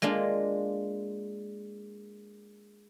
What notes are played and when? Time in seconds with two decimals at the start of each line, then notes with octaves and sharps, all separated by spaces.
0.02 G#3 A#3 D4 F4